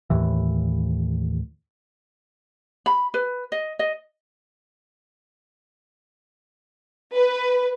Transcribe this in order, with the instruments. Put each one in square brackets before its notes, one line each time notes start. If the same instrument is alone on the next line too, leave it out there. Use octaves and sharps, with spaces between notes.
[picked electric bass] D#2 A2 E3
[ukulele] B5
B4
D#5
D#5
[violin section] B4